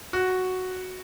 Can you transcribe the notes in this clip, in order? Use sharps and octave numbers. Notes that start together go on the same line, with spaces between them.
F#4